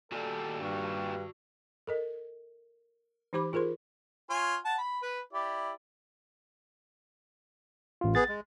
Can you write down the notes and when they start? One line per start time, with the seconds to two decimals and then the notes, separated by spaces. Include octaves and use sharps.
0.12 A#2 G3 F#4 A4 D5
0.60 G2 C#6
1.87 A4 A#4 D#5
3.33 E3 D#4 G4 C5 B5 D6
3.53 F4 G#4 A#4 C5 C6
4.30 F4 C#5 G#5
4.65 F#5 A5
4.78 B5
5.02 B4
5.33 E4 G4 D5
8.01 A1 F4
8.15 B3 G#4 A6
8.29 G#3